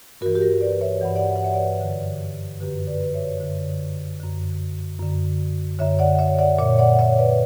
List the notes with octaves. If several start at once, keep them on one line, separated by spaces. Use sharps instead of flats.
G2 E3 F#4 A#4
G4
F#4 A#4
B4 D5
C#5 E5
G2 E3 F#5
D5 F#5
E5
F#5
C#5 E5
B4 D5
F#2 D3
F#2 D3 G4 B4
B4 D5
C#5 E5
F#2 D3
F#2 D3
F#2 D3
F#2 D3 C#5 E5
D5 F#5
C#5 E5
D5 F#5
A#2 C#5 E5
D5 F#5
F#5
C#5 E5
B4 D5